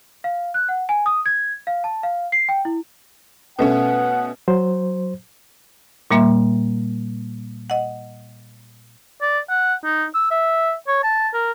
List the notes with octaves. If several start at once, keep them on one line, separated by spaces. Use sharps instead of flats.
F5
F#6
F#5
G#5
D#6
G#6
F5
A5
F5
C7
G5
E4
B2 A3 C#4 F#5
F#3 C5
A#2 G3 A#3 E5 C6
D#5 F#5
D5
F#5
D#4
E6
E5
C#5
A5
A#4